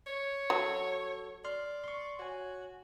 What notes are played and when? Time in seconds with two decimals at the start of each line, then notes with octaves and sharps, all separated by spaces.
0.07 C#5
0.50 F#3 F#4 A4
1.45 D5 C6 F6
1.84 C6 C#6
2.19 F#4 C#5 G#5